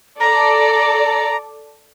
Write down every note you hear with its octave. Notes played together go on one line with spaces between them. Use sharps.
A4 D5 A#5